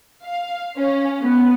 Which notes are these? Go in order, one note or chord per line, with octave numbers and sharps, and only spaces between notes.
F5
C#4
B3